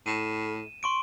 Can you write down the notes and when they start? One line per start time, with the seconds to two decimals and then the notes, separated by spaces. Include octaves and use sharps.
0.06 A2 D#7 E7
0.83 C6 C#6 D7